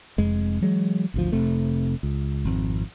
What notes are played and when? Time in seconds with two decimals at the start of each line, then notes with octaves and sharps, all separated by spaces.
0.18 F1 F2 G#3
0.61 E3 F#3 G#3
1.14 G#1 D2 F3
1.32 F1 C3 A3
2.03 C#2
2.45 G#1 F2